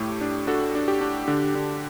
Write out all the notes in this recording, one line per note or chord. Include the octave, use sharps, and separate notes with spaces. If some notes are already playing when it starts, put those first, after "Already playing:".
Already playing: A2 A3 G4
D4
D4 F#4 A4
D4
G4
D4
D3
D3